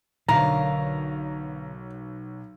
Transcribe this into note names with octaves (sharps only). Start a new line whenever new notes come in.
B1 D3 A#4 C#5 F5 A#5